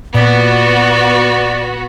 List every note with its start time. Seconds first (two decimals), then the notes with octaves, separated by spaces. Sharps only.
0.14 A#2 B3 F#4 D5